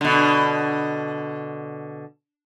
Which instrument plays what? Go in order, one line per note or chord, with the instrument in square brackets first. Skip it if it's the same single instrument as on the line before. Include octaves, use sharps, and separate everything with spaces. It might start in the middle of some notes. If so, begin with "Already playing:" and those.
[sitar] B2 D3